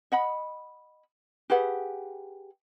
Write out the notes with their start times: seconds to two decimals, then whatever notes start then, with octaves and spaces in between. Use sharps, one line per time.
0.12 D#5 F#5 B5
1.50 G4 G#4 B4 F#5